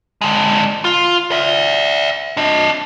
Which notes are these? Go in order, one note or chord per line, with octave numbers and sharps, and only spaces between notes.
D3 G#3
F4
D5 E5
D4 D#5